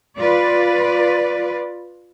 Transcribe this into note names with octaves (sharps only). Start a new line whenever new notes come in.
F4 B4 D5